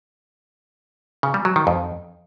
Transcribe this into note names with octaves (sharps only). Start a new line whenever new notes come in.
C#3
G3
F#3
D#3
F2